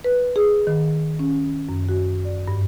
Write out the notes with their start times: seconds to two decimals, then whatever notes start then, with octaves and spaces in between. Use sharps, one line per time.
0.04 B4
0.36 G#4
0.67 D#3
1.19 C#4
1.69 F#2
1.89 F#4
2.25 D5
2.48 G2